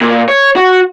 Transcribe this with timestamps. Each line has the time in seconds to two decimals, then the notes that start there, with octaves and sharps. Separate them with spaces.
0.01 A#2
0.28 C#5
0.56 F#4